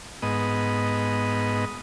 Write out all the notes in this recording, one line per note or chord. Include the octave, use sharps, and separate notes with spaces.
G#2 B3 D#5